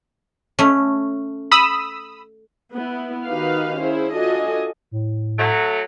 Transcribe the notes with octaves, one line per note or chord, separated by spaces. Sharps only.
A3 C#4
B5 D#6 E6
B3 E4
D#3 D#4 F#4 G4 B4 F5
C#4 E4 G#4 C5
D4 F4 F#4 A4 D#5 G#5
A2
F#3 A3